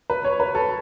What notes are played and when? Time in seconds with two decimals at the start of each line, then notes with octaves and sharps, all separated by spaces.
0.10 B4
0.24 C#5
0.40 B4
0.55 A4